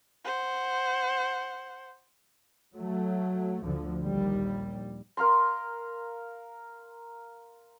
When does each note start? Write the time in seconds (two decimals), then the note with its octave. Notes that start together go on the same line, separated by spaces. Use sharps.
0.25 C5 F#5
2.76 F#3 A3
3.64 D2 D3 F3
4.04 A#1 D#2 G3
5.17 A#4 F5 A#5 C6